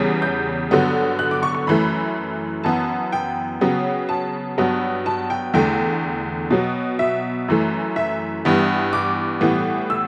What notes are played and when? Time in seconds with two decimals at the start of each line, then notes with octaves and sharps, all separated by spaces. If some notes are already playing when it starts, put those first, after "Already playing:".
Already playing: E2 C#3 G3 B3
0.22 G6
0.71 G2 D3 F#3 B3
1.19 F#6
1.31 D6
1.43 C#6
1.54 C#6
1.67 F#2 E3 A3 B5
2.64 F#2 E3 B3 A5
3.12 G5
3.61 C#3 F#3 B3
4.09 A5
4.58 G2 F#3 B3
5.06 A5
5.30 G5
5.54 E2 D3 A3 G5
6.50 B2 F#3 B3
6.99 E5
7.48 F#2 E3 A3
7.96 E5
8.45 G2 E3 G3 B3
8.93 D6
9.41 A2 E3 G3 B3
9.90 E6